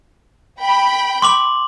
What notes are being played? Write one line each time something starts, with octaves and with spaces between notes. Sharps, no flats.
G5 B5
C6 D6 F#7